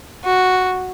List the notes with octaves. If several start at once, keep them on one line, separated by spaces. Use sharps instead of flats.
F#4